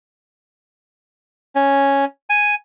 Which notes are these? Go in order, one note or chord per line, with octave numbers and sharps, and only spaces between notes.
C#4
G#5